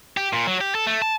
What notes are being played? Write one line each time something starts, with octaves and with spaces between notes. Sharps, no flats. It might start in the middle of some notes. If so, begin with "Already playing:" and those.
G4
A#2
F#3
G4
A4
A3
A5